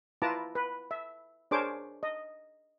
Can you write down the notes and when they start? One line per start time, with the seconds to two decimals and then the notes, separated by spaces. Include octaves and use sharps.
0.22 E4 F4 B4 A5 A#5 D6
0.55 B4
0.91 E5
1.51 D4 G#4 A#4 C5 C#5 D6
2.03 D#5